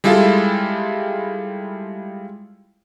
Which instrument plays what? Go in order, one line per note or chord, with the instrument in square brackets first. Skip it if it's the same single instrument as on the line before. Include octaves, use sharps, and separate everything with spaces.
[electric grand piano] G3 G#3 E4 F4 A4